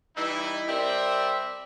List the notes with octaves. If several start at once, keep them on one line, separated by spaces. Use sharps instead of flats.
E3 G3 D#4 E4
G3 C4 A#4 D5 E5